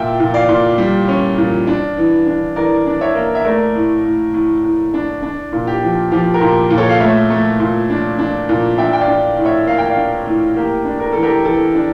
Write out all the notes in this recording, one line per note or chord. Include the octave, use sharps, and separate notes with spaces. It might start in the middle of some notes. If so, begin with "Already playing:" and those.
Already playing: A#2 E5 G5
A#2
D5 F5
A#2
G3
C#4
A#2
D4
E3
D4
E3 A#4 D5
D4
C#5 E5
A#3
E5
A3 A#4 D5
A2
A2
A2
A2
D4
D4
A#2
G4
F3
F3 G4
G4 A#4
A#2
A#2
A4 C#5
F5
A3 C#5 E5
A3
A#2
D4
D4
A#2
D4 E5 G5
G5
D5 F5
D4
A2
C#5 E5
A#3 F5
G5
D5 F5
D4
A2
A#3 G4
D4
A#4
E3 A4
G4 A#4
E3 A4
D4